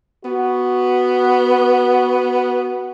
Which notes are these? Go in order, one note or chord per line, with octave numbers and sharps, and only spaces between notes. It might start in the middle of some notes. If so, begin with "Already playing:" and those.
B3 F#4